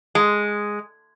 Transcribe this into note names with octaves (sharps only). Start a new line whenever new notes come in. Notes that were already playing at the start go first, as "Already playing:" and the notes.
G#3